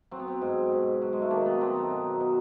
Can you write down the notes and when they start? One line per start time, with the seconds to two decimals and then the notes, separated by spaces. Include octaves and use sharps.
0.11 F#3 C4
0.19 B3
0.28 C4
0.42 G#2
0.72 B2
1.02 F#3
1.13 G#3
1.22 A3
1.30 D#3 A#3
1.46 B3
1.61 F#3 C4
1.75 D#4
1.90 B2
2.20 B2